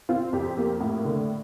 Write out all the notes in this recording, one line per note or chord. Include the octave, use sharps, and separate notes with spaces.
C4 F4
F2 G4
A#3
A2
D3